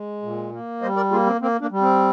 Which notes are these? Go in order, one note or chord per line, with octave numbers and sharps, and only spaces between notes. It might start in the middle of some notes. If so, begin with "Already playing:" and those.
Already playing: G#3
A#2
A#3
G3 C5 D#5
A#4 D5
A#3 F4 G#4
C4
A#3 C4
A#3 D4
G3
C4